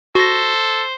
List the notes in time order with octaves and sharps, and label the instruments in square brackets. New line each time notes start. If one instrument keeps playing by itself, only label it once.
[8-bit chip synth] F#4 A#6 [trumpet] A4 [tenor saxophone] C5